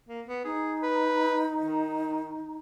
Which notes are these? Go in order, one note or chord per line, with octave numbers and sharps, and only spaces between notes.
A#3
B3
D#4 G#4
B4
D#3